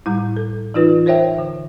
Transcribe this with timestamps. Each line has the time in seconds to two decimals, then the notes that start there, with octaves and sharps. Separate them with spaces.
0.06 A2 G3 E4
0.37 A4
0.74 E3 D#4 F4 B4
1.06 A#4 C5 C#5 E5 G5
1.39 D3